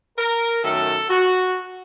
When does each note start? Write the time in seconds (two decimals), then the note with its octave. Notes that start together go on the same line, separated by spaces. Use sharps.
0.17 A#4
0.63 F#2 D#3 F#3 A3 A4
1.09 F#4